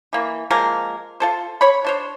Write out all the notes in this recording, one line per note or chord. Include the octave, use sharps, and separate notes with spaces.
E3 A#3
F3 G#3 A#3 A#4
F4 A4 C5
C#5 B5
D4 C5 C#5